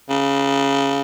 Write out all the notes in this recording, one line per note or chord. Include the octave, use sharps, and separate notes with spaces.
C#3